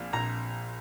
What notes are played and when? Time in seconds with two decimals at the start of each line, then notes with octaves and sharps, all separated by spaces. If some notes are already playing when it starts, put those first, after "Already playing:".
Already playing: A#1 A#2 F3
0.13 A#1 A#5